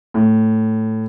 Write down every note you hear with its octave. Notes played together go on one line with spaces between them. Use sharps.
A2